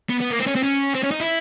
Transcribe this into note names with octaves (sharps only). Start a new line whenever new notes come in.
B3
B3
A#3
C4
C#4
C4
C#4
C4
C#4
D#4
E4